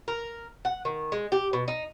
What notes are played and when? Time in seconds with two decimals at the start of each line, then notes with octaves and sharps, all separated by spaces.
0.08 A#4
0.65 F#5
0.85 D#3
1.12 G#3
1.32 G4
1.53 B2
1.68 D#4